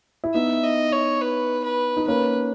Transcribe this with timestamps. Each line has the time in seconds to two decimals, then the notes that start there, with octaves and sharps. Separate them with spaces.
0.24 E4
0.34 B3 D#4 E5
0.63 D#5
0.92 C#5
1.21 B4
1.64 B4
1.97 D#4
2.07 A#3 C#4 B4